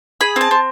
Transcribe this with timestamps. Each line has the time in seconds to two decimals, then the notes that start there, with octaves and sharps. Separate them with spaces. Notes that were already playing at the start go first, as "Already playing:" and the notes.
0.21 G#4 B5
0.36 C4 A5
0.51 C4